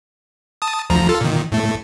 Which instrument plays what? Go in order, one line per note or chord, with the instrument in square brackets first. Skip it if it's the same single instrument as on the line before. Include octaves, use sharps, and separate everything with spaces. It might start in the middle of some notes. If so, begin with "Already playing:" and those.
[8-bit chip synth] A5 D#6
D2 F3 A#5
F4 A4
A#2 D#3
A2 A3